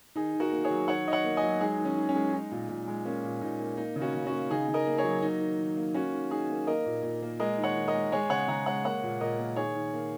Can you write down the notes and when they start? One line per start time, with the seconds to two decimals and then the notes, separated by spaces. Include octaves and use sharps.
0.15 D#3 D#4 G#4
0.34 D#3
0.40 F#4 A#4
0.52 A#3
0.64 G#4 C#5
0.71 F#3
0.88 D#3 C#5 F#5
1.06 D#3 D#5
1.12 C#5 F#5
1.24 A#3
1.37 D#5 G#5
1.43 F#3
1.61 G#3 D#4 G#4
1.78 D#3
1.85 C#4
1.97 D#3
2.09 C#4
2.15 G#3
2.33 G#3 D#4
2.51 A#2
2.69 A#2
2.88 G#3
3.05 A#3 C#4
3.24 A#2
3.41 A#2 D#4
3.60 A#3
3.77 A#3 D#4
3.96 C#3
4.01 C#4 F#4
4.14 C#3
4.26 C#4 F#4
4.32 A#3
4.51 C#3 D#4 G#4
4.68 C#3
4.74 A#4 D#5
4.87 A#3
4.98 G#4 C#5
5.04 F#3
5.23 A#3 D#4
5.41 D#3
5.59 D#3
5.77 A#3
5.94 A#3 C#4 F#4
6.13 D#3
6.31 D#3 D#4 G#4
6.50 A#3
6.67 A#3 A#4 D#5
6.86 A#2
7.03 A#2
7.22 A#3
7.40 G#3 A#4 D#5
7.58 D#3
7.64 C#5 F#5
7.77 D#3
7.88 A#4 D#5
7.94 G#3
8.12 G#3 G#4 C#5
8.30 C#3 C#5 F#5
8.48 C#3 F#5 A#5
8.66 G#3 C#5 F#5
8.84 A#3 C#5 F#5
9.03 A#2
9.21 A#2 A#4 D#5
9.39 A#3
9.56 D#3 G#4 C#5
9.75 D#3
9.94 A#3